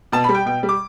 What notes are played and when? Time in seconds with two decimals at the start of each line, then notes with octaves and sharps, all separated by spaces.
0.12 B2 A5
0.24 G3 B5
0.35 G5
0.46 B2 G5
0.63 G3
0.69 D6